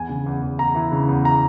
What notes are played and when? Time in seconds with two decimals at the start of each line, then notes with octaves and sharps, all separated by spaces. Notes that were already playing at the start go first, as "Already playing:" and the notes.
Already playing: E2 G#5
0.09 C#3
0.26 E2
0.42 E2
0.59 E2 A#5
0.75 E3
0.92 C#3
1.08 E2
1.25 A#5